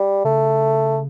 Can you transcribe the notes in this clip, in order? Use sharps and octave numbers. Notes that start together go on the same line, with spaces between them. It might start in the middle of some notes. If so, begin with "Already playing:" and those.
Already playing: G3
C#3 A3